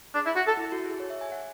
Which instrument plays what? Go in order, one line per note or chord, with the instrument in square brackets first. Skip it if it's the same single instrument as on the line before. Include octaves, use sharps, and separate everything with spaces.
[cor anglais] D4 [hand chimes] G#4
[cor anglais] E4
F#4
A4
[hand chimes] E4
F#4
G#4
C#5
E5
G#5
F#5